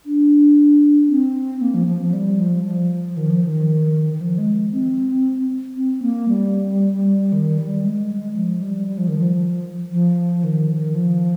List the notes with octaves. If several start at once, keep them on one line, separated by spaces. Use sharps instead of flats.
D4
C4
A#3
F3
F3
F3
G3
F3
F3
D#3
F3
D#3
D#3
F3
G#3
C4
C4
A#3
G3
D#3
G3
G#3
F3
G3
G3
F3
D#3
F3
F3
D#3
D#3
F3